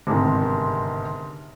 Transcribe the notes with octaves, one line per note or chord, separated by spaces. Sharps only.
G1 G#2 C3 D#3